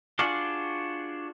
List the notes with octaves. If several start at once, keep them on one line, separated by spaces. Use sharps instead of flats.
D4 F4 F#4 G#4